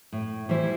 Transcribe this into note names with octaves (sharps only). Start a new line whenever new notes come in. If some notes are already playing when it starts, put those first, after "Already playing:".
A2
E3 G3 E4 C5